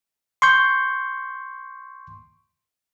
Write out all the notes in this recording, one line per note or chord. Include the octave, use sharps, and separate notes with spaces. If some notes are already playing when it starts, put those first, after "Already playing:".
C6 C#6 G6